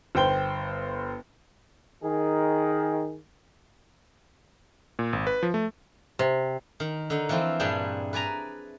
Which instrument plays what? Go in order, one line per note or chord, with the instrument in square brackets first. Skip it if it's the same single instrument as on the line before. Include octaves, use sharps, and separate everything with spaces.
[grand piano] G1 C5 G5 G7
[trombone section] D#3 G#4
[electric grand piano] A#2
G#1
B4
F3
A3
[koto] C3
[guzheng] D#3
D3 D#4
E3 F3 C4 E4 F4
G2 A#2 G3 D4 G#4 G5
B4 D5 G#5 A#5